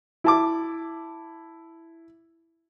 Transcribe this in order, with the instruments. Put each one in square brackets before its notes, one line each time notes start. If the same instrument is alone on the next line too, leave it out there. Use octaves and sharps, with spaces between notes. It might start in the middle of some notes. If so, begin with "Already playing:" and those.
[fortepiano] E4 A5 D6